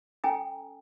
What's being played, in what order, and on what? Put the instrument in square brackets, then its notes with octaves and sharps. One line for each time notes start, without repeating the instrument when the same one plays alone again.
[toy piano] C#4 A4 G5 G#5 A#5 D#6